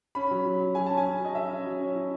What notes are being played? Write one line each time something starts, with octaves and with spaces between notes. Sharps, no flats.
C#4 B5
F#3
F#3
F#3
F#3 G#5
C#4 A5
G#5
C#4
F#3
D#5
C#4 E5
C#4
F#3
C#4
E4